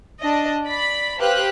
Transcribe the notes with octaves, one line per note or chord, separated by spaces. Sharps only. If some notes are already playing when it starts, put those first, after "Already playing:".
D4 D#5
D5 B5
G4 B4 C5 F5 F#6